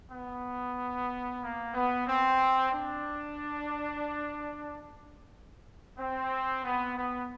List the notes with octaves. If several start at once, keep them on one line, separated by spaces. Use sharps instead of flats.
B3
A#3
B3
C4
D4
C4
B3
B3